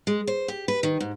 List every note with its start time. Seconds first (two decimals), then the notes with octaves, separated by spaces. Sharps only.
0.07 G#3
0.27 C5
0.48 G4
0.68 B4
0.83 D#3
1.00 G#2